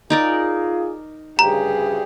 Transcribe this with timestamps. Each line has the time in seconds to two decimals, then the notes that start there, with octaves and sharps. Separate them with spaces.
0.10 D#4 F4 G#4 A#4 D5
1.39 D2 G2 C#3 G4 G#4 A#5